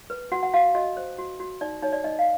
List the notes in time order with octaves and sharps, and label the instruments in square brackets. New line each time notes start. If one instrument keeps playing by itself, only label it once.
[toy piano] B4
F#4 F#5
F#5
F#4 F5
F#4 D#5
C5
F#4
F#4
D#4 D5
D#4 C#5
D5
D#4 D#5
F5